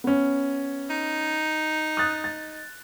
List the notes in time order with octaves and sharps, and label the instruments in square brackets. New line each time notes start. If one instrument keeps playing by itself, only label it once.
[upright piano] B3 C#4
[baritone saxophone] D#4
[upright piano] D#6 F#6 A6
A6